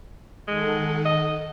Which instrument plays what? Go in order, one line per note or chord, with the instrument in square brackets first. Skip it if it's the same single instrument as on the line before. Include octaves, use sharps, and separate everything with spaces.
[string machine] D#3 A4 F#5 [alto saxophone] G#3
[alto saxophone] D#5